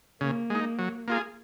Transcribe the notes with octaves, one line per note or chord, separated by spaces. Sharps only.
C#3 A#3
G#3 D#4
F#3
A#3 F4 G#4